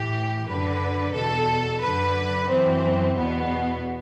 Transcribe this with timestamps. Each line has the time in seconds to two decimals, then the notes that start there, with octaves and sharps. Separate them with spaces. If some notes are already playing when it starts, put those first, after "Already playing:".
Already playing: A2 E3 G4
0.47 F#2 D3 B4
1.14 E2 B2 A4
1.81 F#2 D3 B4
2.49 F#2 E3 C4
3.17 E2 B2 B3